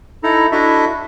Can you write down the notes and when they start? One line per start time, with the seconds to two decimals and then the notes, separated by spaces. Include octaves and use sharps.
0.23 D#4 E4 A4 A#5
0.52 D4 E4 F#4 A4 D#5 E5